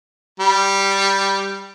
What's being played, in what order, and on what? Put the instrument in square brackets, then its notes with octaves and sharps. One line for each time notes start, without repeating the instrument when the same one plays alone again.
[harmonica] G3